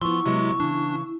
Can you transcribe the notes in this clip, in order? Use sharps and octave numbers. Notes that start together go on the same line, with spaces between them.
F3 B3 E4 C6 C#6
C3 F#3 G#3 B3
C#3 E3 D4